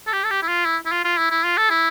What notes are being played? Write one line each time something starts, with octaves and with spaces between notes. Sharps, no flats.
A4
G4
A4
G4
E4
F4
E4
E4
F4
F4
E4
E4
F4
A4
E4